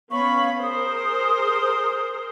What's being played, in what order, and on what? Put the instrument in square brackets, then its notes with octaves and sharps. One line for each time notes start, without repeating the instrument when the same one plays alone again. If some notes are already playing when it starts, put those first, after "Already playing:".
[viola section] B3 C#4 B5 [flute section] C#5 F5 C#6
[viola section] G#4 A#4 C5 [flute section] D#6